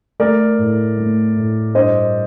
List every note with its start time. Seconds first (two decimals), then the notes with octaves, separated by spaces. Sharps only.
0.20 A3 A#4 D5
0.59 A2
0.97 A3
1.36 A2
1.75 G2 C5 D#5